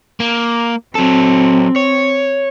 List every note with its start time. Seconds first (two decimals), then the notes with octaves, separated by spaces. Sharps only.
0.20 A#3
0.95 F#3 C4 A4
1.76 C#5